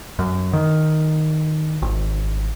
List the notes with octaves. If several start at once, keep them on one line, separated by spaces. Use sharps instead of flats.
F#2
D#3
G#1